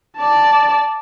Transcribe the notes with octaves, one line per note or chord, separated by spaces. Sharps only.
D5 A5